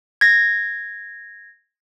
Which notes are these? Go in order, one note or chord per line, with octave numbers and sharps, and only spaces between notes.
G#6 A#6